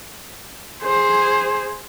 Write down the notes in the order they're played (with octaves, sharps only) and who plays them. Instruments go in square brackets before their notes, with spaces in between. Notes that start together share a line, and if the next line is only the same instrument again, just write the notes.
[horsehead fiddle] G#4 C5